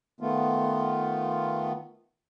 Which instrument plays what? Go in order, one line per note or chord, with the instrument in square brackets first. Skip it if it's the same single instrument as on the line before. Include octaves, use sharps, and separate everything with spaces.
[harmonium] D#3 A3 B3 F4